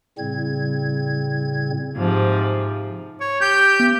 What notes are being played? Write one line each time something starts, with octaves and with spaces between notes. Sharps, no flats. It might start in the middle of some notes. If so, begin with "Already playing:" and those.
A2 C#3 G3 C4 G#6
G#2 C3 F3
C#5
G4 G6
B3